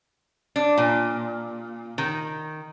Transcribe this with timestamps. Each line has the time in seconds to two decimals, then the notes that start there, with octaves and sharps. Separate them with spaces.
0.56 D4
0.78 A#2
1.98 D#3